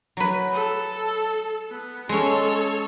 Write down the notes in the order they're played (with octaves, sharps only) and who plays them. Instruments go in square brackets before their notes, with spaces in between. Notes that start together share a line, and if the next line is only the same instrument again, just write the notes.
[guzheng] F#3 B4
[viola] A4
B3
[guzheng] G#3 C#4 [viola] A4 C#5